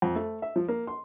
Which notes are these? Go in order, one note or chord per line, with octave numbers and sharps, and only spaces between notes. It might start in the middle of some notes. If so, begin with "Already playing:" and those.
F2
A3
E5
F3
A#3
C6